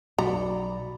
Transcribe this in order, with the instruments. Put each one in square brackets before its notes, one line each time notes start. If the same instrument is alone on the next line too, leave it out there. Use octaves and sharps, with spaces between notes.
[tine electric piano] B1 D5 B5 [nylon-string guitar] F#4 [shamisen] A#5